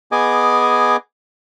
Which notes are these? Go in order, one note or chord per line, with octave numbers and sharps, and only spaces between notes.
B3 G#4 D#5 G#5 D6